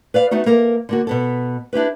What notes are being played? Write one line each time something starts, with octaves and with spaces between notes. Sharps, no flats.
B4 D5 F5
A3 B3 D#4 F#4
A#3 A4 A#4
D3 A#3 F#4
B2 B3 A4
D4 E4 G4 B4